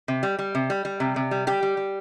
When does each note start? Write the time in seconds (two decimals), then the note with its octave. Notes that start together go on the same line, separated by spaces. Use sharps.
0.08 C3
0.23 G3
0.39 G3
0.55 C3
0.70 G3
0.85 G3
1.00 C3
1.16 C3
1.31 G3
1.47 G3 G4
1.63 G3
1.77 G3